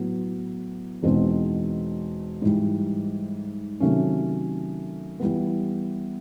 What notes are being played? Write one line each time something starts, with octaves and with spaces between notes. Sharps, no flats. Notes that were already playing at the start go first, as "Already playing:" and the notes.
Already playing: A2 F#3 B3
E2 B2 G#3 C4 D#4
G#2 E3 G3
C3 D#3 F#3 A3 C#4
E3 G3 B3